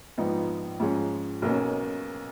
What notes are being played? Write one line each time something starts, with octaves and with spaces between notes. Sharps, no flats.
A#1 G#2 F3 B3 D#4
G#2 F3 G#3 C#4
B1 B2 A#3 C#4